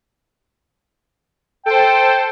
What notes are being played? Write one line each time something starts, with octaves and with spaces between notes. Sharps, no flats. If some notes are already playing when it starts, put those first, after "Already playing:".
A4 C5 G5